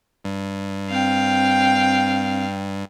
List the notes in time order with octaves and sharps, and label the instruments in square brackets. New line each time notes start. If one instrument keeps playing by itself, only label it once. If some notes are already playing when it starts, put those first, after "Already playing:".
[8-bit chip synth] G2
[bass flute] C4 [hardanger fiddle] F5 G5